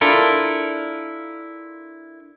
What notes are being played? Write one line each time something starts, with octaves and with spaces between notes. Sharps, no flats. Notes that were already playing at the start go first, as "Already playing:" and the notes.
D4 E4 F4 A4 A#4